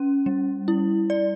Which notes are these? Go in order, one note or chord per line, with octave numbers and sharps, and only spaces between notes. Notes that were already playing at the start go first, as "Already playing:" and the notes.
Already playing: C#4
G3
E4
D5